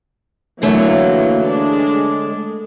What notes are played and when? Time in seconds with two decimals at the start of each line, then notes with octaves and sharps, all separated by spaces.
0.62 D3 E3 F#3 A3 A#3 C#5
1.46 G#3 D4